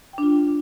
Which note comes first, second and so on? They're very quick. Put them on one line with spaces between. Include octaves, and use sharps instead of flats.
G5 D4 F4